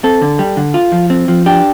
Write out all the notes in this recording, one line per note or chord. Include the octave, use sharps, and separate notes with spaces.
C4 A4
D3
G3
D3
F4
F3
C4
F3
D4 G4